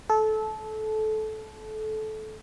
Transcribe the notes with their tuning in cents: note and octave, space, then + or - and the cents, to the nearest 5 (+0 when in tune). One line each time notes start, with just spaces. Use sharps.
A4 -25